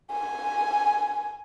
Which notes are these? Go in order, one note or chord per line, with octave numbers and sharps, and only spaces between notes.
G#5